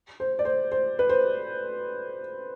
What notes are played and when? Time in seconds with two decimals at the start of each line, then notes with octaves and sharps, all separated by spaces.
0.20 C5
0.39 D5
0.45 C5
0.72 C5
0.99 B4
1.09 C5